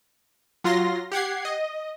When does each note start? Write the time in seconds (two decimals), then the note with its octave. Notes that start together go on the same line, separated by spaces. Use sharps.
0.64 F#3 F4 C6 A#6
1.12 G4 F#5 G#6 C7
1.45 D#5